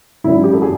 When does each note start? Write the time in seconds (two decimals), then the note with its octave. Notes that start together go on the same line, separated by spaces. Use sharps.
0.24 G#1 F#2 D#3 E4
0.44 G4
0.53 A4
0.62 G#4